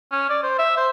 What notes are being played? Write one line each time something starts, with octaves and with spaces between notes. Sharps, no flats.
C#4
D5
C5
E5
C5